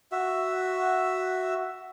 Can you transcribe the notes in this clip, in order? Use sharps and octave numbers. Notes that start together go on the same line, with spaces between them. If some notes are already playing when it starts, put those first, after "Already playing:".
F#4 E5